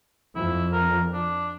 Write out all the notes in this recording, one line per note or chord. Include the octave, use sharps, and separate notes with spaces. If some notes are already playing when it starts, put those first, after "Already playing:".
F2 E4
A#4
D4